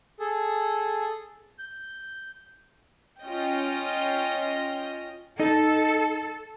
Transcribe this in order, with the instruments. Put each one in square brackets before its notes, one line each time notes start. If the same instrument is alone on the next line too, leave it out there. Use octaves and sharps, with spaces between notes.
[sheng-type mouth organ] G#4 A4
G6
[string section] C#4 F4 D#5 G5
[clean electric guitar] D#4 D#5 [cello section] A4